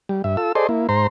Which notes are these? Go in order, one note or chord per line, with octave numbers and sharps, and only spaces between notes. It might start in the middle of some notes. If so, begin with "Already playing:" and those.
G3
G2 E5
F4 A4 E6
G#4 A4 C5 D5 D#5 C6
A#3 E4
G#2 C5 A#5 C6